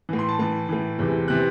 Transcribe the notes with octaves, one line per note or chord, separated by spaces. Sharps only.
A2 E3
C6
A5
A2 E3 A5
A2 E3
E2 C3 E3
C3 E3 F#6